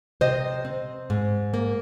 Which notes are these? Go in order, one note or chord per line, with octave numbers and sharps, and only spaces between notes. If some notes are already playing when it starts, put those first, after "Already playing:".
C3 C5 D#5
C4
G#2
A#3